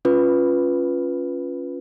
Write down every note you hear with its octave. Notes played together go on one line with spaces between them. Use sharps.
C#4 F4 B4